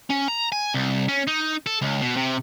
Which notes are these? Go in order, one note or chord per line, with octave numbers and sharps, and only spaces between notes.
C#4
A#5
G#5
C2
C#4
D#4
A4
C#2
B2
C3